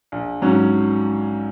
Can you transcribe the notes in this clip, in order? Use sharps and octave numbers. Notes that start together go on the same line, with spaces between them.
A#1
G#2 F#3 C#4 F#4